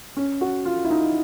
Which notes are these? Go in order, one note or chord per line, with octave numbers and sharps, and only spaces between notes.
C#4
F#4
F4
E4
D#4